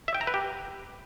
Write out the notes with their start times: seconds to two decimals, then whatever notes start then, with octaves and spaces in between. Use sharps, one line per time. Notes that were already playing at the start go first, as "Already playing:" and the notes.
0.08 E5
0.14 G5
0.21 A#5
0.27 B4
0.34 G4